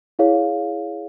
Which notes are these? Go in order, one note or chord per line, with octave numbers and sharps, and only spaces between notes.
E4 G#4 C#5 F5